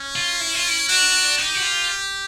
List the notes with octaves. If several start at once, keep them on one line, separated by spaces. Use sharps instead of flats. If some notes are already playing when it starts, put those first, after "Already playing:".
Already playing: C#4
F4
E4
F4
E4
D4 F#4
D#4 G4
F#4
F4